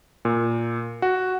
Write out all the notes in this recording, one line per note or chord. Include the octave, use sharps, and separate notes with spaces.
A#2
F#4